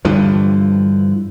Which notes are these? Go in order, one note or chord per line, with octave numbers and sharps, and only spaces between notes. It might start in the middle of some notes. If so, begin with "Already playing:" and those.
G2 D3 E3 F3